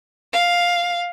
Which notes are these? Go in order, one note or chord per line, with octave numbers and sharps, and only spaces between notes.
F5